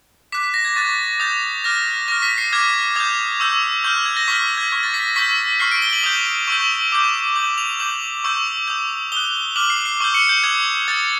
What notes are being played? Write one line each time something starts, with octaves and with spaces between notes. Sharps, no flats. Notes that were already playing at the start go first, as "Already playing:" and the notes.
D6 F#6 B6
B6
A#6
G#6
C#6 F#6 A6
D#6 G6 A6
D6 F6 A#6
C#6 F6 A#6
B6
C7
D6 F6 G#6
D#6 G6 G#6
C#6 E6 G6
C#6 F6 G6
G#6
A#6
C#6 F6 B6
G#6
C#6 F6 G#6
A6
B6
A#6
C#6 E6 G6 B6
C#6 F6 C7
D7
G7
F#7
D#6 G6
C#6 E6 G6
D6 G6
D6 G6 F#7
F7
D6 G6 F#7
C#6 E6 G6
D#6 G6
D#6 F#6 G7
D6 F6 F#7
C7
C7
C#6 E6 G6
C#7
G6
D#6 F#6 G#6
D#6 F#6 A6